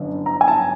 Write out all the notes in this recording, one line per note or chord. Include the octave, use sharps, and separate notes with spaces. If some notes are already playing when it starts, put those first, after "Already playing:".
Already playing: G1 F#2 D3
A#5
G#5
A5